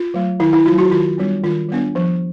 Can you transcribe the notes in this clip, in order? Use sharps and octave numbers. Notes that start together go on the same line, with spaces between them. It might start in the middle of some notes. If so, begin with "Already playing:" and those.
Already playing: F4
F#3 A3
D#3 E4
E4
F#3 A3 F4
F#4
D#3 F4
G3 B3 D4
D#3 F4
G3 B3 D4
F3